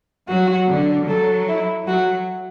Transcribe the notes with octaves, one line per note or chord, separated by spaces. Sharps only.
F#3 F#4
D3
F#3 A4
E4
F#3 F#4